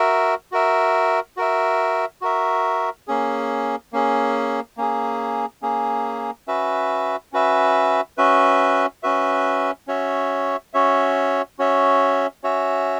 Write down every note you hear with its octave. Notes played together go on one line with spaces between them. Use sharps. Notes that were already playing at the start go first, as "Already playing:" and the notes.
Already playing: F#4 A#4 E5
F#4 A#4 E5
F#4 A#4 E5
F#4 A#4 E5
A#3 C#4 G#4
A#3 C#4 G#4
A#3 C#4 G#4
A#3 C#4 G#4
C#4 F#4 B4 E5
C#4 F#4 B4 E5
C#4 F#4 B4 E5
C#4 F#4 B4 E5
C#4 F#4 C#5 E5
C#4 F#4 C#5 E5
C#4 F#4 C#5 E5
C#4 F#4 C#5 E5